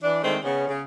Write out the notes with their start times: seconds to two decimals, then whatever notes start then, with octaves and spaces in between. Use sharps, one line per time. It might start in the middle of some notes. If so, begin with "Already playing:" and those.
0.03 E3 D4
0.22 D#3 G#3 A3 C4 D4
0.43 C#3 B3 C#4
0.68 C#3